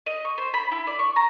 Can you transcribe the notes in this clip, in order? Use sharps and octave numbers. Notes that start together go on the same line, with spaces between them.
D#5
C#6
C5
B5
E4
D5
C#6
A#5